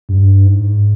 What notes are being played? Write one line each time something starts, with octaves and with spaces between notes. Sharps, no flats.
G2
G#2